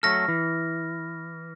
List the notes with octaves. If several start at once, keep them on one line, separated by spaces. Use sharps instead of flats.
F#3 A3 A4 F6 A#6
E3